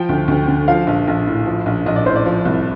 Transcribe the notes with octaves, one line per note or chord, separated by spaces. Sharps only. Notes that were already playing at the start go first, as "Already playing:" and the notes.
Already playing: F3 G5
D2
D2
D3
F3 F5
A#1
A#1
A2
F3
A#1
A#1 D#5
D5
A2 C5
D5
F3
C2